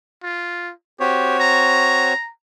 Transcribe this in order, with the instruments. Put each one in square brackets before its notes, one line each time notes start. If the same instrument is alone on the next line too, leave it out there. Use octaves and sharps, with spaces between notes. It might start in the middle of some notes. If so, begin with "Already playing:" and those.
[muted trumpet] F4
[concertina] C4 F#4 C#5 [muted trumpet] G4
[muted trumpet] A#5